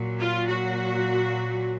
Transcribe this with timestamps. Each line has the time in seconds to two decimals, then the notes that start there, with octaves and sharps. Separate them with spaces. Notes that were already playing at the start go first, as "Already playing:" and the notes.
Already playing: A#2 F#3
0.19 F4
0.47 F#4